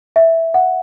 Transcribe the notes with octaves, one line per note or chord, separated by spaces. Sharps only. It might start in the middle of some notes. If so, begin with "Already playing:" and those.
E5
F#5